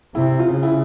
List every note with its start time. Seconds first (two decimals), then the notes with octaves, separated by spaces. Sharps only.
0.15 C3 E4
0.39 F4
0.51 C#3
0.63 E4